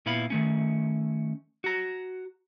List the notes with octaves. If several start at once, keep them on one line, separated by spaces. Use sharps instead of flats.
A#2 B3 E4 F5 B5
D#3 A3 C#4
F#4 A#5